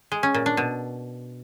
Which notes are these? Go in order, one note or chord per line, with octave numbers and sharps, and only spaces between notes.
G#3
C#4
A#2
D4
B2